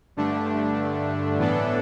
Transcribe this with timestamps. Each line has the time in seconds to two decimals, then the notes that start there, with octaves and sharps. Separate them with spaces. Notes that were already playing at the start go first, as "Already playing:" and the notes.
0.17 G2 D3 A3 D4
1.38 A2 E3 B3 D4 A4